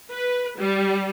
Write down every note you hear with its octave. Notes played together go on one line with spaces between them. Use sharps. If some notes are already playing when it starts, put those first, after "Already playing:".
B4
G3